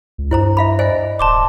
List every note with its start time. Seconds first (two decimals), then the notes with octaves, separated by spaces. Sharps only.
0.18 C#2
0.31 G2 E4 C5 A#5
0.57 E5 F5 B5
0.79 C5 D5 D#5 G#5
1.19 D1 A5 C6 D6